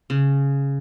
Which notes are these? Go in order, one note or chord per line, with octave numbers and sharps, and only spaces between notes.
C#3